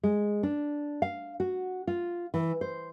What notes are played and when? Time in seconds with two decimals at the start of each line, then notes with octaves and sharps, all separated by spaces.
0.03 G#3
0.43 D4
1.02 F5
1.40 F#4
1.87 F4
2.34 E3
2.61 C5